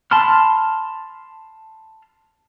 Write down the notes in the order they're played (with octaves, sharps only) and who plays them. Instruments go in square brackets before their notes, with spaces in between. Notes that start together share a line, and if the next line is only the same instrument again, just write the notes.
[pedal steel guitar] A5 B5 C6 F6